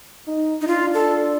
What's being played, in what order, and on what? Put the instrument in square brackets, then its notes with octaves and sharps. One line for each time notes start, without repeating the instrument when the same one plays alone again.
[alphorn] D#4
[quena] D#4
[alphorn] D4 [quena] F4
[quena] A4